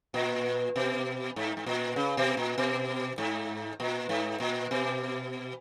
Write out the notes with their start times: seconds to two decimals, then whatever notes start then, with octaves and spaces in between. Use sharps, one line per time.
0.14 A#2
0.76 B2
1.36 G#2
1.57 G#2
1.66 A#2
1.96 C#3
2.17 B2
2.37 A#2
2.58 B2
3.18 G#2
3.80 A#2
4.09 G#2
4.40 A#2
4.71 B2